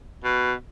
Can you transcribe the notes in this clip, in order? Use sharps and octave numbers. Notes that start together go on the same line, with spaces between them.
B2